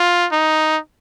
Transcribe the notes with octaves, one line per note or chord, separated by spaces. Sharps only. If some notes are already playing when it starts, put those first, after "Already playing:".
Already playing: F4
D#4